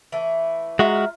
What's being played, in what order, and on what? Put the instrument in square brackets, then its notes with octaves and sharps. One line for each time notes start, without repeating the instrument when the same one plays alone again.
[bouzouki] E3 A3
[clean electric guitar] G#3 F#4 [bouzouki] F4 E5 A#5